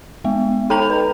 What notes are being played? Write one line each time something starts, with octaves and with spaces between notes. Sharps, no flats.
G#3 B3
D#4 A4 G5 A#5 G6 F7
B4